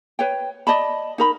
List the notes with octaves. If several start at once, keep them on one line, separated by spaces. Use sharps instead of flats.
B4 C#5 G5
D5 D#5 A5 B5
D#4 A#4 B5